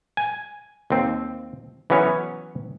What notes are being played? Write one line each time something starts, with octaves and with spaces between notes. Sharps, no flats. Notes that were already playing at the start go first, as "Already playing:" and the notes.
G#5
D#2 C4
E3 F#3 B3 C#4 C#5